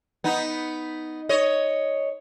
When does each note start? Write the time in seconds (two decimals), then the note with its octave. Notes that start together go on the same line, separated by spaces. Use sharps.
0.24 B3 D#4
1.29 C#5 D#5